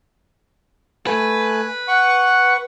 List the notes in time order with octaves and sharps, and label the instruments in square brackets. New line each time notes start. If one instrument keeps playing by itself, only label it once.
[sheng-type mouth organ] A3 G#5 [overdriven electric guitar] B4
[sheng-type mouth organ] F#5 C#6